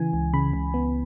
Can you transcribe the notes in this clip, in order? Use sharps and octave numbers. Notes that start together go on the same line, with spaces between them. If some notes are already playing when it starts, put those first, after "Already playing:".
Already playing: C#3 E3 G#5
C#2
C#3 B5
C#2
B3